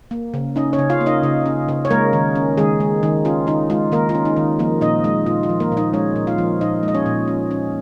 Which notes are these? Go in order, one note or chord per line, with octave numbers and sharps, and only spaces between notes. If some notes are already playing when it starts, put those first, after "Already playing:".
A#3
C#3
C#4 D#4 D#5
C#4 C#5
C#3
F4 F5
A#3
D#4 D#5
C#3
C#4
C#3
C#5
G#3 A#3 A#4
D#3
C#4
D#3 G#3 G#4
G#3
D#3
C#4 F4
D#3 D#4
G#3 F4
D#3 A#3 A#4
F4
C#4
D#4
D#3
F3 A#3 A#4
A#2 D#4 D#5
G#3 D#4 D#5
A#2 F4
F4
F3
A#3 A#4
A#2
D#4 D#5
G#3 C#4 C#5
A#2
F4 F5
F3
A#2 D#4 D#5
G#3
D#5
C#4 C#5
A#2
C#4
C#4